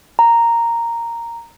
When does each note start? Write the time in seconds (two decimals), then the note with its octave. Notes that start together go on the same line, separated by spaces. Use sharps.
0.19 A#5